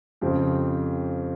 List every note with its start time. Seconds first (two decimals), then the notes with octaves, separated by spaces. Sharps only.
0.21 F2 C#3 F3 C4 G4